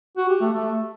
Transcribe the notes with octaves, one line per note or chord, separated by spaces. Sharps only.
F#4
G4
A3
A3